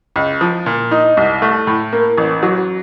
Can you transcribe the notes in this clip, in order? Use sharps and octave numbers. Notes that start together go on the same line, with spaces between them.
C#2
F3
A#2
D#4
C2
A3
A2
A#3
A1
F#3